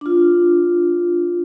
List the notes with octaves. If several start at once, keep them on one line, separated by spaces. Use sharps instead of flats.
D4 F4